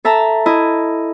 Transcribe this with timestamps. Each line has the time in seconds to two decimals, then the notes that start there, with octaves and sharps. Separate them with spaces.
0.05 A4 E5 A5 A#5
0.46 E4 D#5